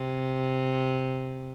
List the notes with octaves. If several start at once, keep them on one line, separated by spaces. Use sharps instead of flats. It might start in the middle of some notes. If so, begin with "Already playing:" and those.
Already playing: C3